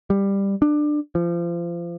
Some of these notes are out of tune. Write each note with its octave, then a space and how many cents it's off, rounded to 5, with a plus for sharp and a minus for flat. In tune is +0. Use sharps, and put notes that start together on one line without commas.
G3 +10
D4 +20
F3 -30